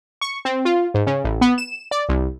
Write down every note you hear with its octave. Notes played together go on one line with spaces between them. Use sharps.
C#6
C4
F4
G#2
C#3
A1
B3
E7
D5
C2